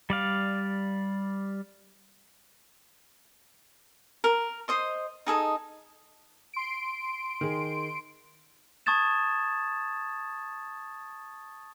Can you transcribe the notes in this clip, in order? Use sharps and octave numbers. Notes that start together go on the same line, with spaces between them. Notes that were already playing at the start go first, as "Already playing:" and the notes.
G3 D5 F5
A#4
C5 D#5 C6
D#4 G#4 A4 D#5
C6 D7
D#3 G#4
A5 C#6 D#6 G#6 A6 E7